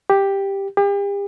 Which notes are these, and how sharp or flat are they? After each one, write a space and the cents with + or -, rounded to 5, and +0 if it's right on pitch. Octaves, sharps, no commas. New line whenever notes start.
G4 +5
G4 +40